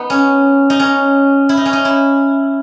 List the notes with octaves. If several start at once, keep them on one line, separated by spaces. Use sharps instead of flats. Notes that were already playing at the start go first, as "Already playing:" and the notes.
Already playing: B3 D#4
C#4
D#4
C#4
E4
D#4
C#4
D#4
E4